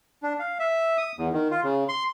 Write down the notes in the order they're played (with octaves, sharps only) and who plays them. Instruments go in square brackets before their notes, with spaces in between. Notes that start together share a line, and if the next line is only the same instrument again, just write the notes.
[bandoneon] D4
F5
E5
D#6
E2
D#3
F4
C#3
C6